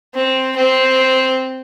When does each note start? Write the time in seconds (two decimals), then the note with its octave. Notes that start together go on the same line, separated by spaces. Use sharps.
0.15 C4
0.56 C4